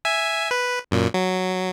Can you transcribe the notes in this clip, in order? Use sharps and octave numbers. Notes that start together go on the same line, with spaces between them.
E5 G#5
B4
F#2 A#2
F#3